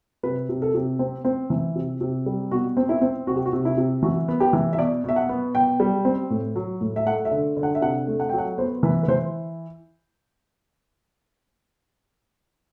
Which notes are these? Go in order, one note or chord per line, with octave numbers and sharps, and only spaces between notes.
C3 B4
C3
A4
C3
C4
C4
E3
C3
C3
G3
B2 F#4
C4
E4
C4
C3 F#4
G4
F#4
C3
E4
C3
E3 F#4
B3
G4
E3
E5
B2 D5
B2 E5
F#5
B3
B2 G5
G3
C4
A2
F#3
A2
E5
A3 F#5
E5
D3
D3
F#5
E5
C3 F#5
A3
F#5
F#3 G5
F#5
B3 C5
E3 B4
B4
E3 C5